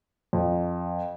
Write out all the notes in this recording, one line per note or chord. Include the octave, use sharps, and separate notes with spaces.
F2